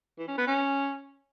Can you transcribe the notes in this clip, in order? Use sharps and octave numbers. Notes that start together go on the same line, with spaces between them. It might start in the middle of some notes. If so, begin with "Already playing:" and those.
E3
C#4
B3
C#4